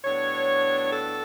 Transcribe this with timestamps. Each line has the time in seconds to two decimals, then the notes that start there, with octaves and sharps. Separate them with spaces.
0.03 A2 F#3 B3 D4 C#5
0.91 A4